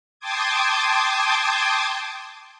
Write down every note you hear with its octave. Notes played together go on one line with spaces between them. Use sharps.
G5 A5 C6 D6 D#6 G#6